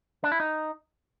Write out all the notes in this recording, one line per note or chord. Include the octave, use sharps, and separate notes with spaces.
D4
E4
D#4